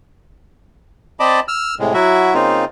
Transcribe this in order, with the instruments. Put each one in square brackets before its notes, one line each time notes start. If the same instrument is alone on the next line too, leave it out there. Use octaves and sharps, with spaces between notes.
[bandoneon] C4 D5 D#5 A5 B5 D6
E6 F6
A2 C3 G#3
F#3 E4 F#4 E5
C#3 A#3 C4 D#4 F4